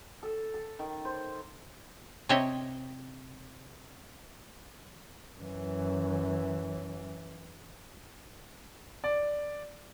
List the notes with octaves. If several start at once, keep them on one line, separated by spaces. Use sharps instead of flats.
A4
A4
D#3
C5
C3 C4 C#5 D#5 E5
F#2 E3
D5